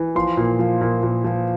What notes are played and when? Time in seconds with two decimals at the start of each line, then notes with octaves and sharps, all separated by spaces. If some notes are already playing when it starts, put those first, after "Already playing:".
Already playing: E3
0.15 F3 C6
0.37 A#2
0.59 F3
0.81 A#2
1.03 A#2
1.24 F3